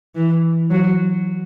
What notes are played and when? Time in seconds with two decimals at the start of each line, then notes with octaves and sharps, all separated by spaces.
0.15 E3
0.70 F#3